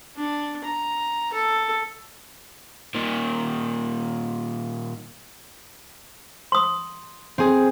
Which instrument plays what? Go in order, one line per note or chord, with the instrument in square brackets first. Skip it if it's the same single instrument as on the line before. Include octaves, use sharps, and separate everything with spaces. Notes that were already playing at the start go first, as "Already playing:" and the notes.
[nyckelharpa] D4
A#5
A4
[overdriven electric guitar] A#2 D#3
[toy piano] C6 D#6
[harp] C4 G#4